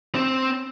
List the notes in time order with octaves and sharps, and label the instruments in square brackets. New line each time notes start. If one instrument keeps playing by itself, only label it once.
[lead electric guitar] C4